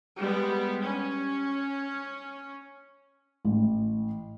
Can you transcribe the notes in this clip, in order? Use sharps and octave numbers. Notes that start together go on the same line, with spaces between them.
G3 G#3 B3
C#4
A1